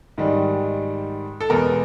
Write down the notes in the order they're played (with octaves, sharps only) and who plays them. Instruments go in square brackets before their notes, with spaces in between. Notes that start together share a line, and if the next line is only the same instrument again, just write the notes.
[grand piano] G#2 D#3 G3
A4
E2 B2 G#3 B3 A#4